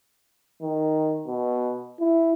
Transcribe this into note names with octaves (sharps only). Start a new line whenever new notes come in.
D#3
B2
E4